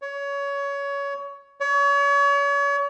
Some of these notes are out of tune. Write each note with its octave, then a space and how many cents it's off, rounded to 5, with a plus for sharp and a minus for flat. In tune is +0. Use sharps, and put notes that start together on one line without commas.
C#5 +20
C#5 +35